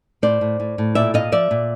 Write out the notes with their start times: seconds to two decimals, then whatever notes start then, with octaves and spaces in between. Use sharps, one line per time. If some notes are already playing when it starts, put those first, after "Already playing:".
0.22 A2 C5 D5
0.41 A2
0.60 A2
0.78 A2
0.95 A#2 D5 E5
1.14 A#2 D#5 F5
1.32 F3 D5 E5
1.51 A#2